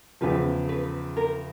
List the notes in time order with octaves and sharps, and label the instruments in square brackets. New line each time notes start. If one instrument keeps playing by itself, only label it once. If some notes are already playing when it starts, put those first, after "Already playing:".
[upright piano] E2 C#3 F3 [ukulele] B4
[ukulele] B4
A#4